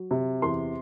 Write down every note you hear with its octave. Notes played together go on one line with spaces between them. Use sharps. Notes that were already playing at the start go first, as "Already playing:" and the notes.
Already playing: F#3
C3
E2 C6